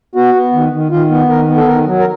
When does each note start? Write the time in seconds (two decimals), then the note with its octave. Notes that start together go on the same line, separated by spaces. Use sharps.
0.15 B3 F#4
0.34 B3
0.53 D#3
0.72 D#3
0.91 D#3 F4
1.10 B3
1.29 D#3 A#4
1.48 B3
1.57 A4
1.67 D#3 A#4
1.86 F#3
1.99 A#4